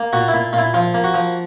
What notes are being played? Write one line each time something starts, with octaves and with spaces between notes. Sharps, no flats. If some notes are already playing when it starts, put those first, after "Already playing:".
Already playing: A#3
A#2 F#4
A#2 E4
A#2 F4
E4
F3 F4
A#3
F#4
F3